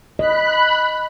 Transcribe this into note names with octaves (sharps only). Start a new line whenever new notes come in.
D#5 B5 F#6